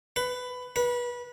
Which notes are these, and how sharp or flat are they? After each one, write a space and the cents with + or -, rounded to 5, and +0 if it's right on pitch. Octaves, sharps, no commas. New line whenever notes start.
B4 +15
B4 -25